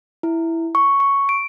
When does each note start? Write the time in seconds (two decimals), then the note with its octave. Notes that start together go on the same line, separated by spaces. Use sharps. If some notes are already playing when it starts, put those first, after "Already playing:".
0.23 E4
0.75 C#6
1.00 C#6
1.29 D7